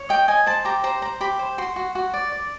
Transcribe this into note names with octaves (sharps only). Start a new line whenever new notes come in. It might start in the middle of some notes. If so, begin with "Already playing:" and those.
Already playing: C#5
D#5 G5
D#5 G#5
C5 A5
G4 A#5
C5 A#5
C5 A#5
G4 B5
C5
F#4 C6
F#4
F#4
D5
D5